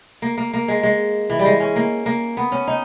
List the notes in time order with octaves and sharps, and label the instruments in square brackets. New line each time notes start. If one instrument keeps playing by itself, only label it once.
[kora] A#3
A#3
A#3
G#3
G#3
E3
G3
G#3
C#4
A#3
A#3
B3
C#4
D#4